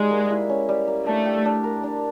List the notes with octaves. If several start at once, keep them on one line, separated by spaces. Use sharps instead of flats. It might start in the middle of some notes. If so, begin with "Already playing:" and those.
Already playing: G3 G#3 D#4
A#3
E4
C#4
G3
A#3
A3 D4
G4
D4
A#4
D4